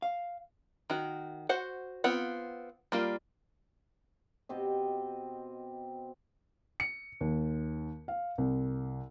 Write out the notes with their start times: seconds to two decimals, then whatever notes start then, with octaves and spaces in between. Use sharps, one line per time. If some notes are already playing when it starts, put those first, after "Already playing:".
0.02 F5
0.90 D#3 F#4
1.49 F#4 C5 F#5
2.04 B3 C4 F4 F#5
2.92 G3 A#3 F4
4.49 B2 C4 G4 D#5
6.80 C#7
7.21 D#2
8.08 F5
8.38 C2